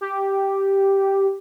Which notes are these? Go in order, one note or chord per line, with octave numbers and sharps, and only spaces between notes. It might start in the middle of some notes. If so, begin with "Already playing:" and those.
G4